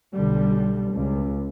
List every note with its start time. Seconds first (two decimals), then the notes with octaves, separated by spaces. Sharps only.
0.13 B1 D3 G3
0.91 C#2